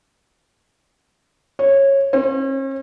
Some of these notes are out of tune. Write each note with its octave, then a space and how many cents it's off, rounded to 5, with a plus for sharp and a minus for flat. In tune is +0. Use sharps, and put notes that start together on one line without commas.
C#5 -15
C#4 -45